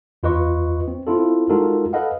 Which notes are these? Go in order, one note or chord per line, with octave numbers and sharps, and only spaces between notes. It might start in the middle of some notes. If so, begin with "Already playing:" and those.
E2 F4 B4 D#5 C#6
C4
C4 E4 F4 A4
G#3 D#4 F4 F#4 A4 A#4
A4 B4 D#5 F5 F#5